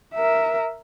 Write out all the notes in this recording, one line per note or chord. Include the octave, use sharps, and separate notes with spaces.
A#4 E5